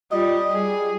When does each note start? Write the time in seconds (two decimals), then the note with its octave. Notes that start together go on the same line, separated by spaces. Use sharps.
0.12 G3 F4 D#5
0.52 G3 G#4